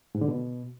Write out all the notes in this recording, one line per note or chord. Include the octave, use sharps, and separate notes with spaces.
G#2
D3
B2